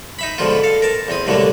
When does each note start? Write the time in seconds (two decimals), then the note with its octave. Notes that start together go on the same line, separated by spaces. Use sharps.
0.19 D#4 E5 B5
0.38 G#2 B2 D3 F3 F4
0.63 A4 F5
0.82 A#4 A5
1.09 E2 C4 D#6
1.27 C2 A2 D3 F#3 G#3 A#3